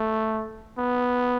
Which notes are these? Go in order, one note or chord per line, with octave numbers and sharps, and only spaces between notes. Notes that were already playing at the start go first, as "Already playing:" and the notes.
Already playing: A3
B3